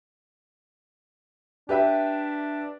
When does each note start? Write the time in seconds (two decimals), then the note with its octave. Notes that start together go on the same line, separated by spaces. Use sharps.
1.69 D4 G4 B4 E5